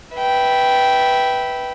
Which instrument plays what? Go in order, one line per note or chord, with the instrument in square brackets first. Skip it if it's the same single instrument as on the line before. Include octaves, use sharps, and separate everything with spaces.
[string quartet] B4 E5 G5